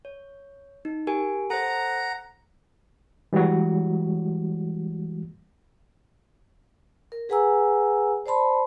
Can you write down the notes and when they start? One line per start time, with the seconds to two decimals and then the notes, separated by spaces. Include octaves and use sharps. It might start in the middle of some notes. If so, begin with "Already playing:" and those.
0.05 C#5
0.85 D#4
1.07 G4 A#4 G#5
1.50 A4 C5 F#5 A#5
3.33 E3 G3 G#3 F#4
7.12 A#4
7.29 G#4 B4 F#5 G#5 A#5 E6
8.26 C5 D5 A5 B5 C6